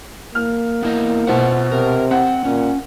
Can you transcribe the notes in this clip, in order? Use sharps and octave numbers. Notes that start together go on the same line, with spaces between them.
A#3 F6
B3 E4 D#5
B2 F4 C5 E5 F#5
C3 A#4
C4 F#5
A#2 C#4